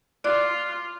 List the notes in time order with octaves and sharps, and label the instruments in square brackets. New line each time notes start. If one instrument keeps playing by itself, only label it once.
[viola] F4 [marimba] D5 D6 F#6